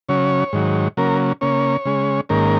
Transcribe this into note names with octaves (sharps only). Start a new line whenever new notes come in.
C#3 F#3 C#4 C#5
G#2 D#3 F#3
C#3 F#3 A#3 C#4 A#4
C#3 A#3 C#4 C#5
C#3 G#3 C#4
G#2 D#3 A#3 C#4 A#4